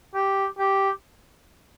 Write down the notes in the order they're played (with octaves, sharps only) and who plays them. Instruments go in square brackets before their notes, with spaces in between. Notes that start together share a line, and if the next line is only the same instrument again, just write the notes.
[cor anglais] G4
G4